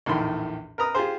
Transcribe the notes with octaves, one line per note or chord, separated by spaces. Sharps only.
A#1 E2 A2 D#3 B5 C6
A#4 B4 A#5 D#6
F4 G4 G#4 C5